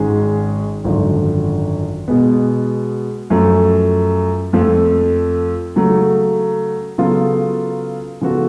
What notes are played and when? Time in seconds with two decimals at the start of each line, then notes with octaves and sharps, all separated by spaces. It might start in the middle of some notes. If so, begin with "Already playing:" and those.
Already playing: G#1 G#2 G#3 C#4 G#4
0.84 G#1 F#2 D3 F3
2.08 B2 G#3 B3
3.30 F#2 F3 A3
4.53 F2 F3 A3
5.76 C#3 F#3 A3
6.98 C#3 F#3 B3 F4 A4
8.21 C#3 F3 B3 F#4 A4